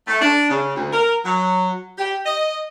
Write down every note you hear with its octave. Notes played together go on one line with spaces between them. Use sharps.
A3
D4
C#3
D2
A#4
F#3
G4
D#5